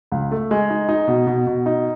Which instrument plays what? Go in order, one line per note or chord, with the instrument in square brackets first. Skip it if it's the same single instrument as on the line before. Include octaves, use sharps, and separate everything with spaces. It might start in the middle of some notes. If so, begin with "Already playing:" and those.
[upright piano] C#2
A3
G#3
D#4
D#4
B2
B2
B2
D#4